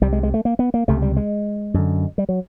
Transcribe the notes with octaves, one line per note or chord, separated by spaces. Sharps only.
C2 C3 G3
G#3
G#3
A3
A#3
B3
A#3
C#2 C3 A3
G3
G#3
F#2 D3
G3
F#3